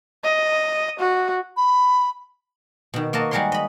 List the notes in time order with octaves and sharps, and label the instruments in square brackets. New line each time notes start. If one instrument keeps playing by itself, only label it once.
[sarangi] D#5
F#4
[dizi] B5
[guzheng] B2 D#3
A#3 F#4 A#4 D#5 A5
G3 G#3 F#4 A#4 C#5 C6
D#5 B5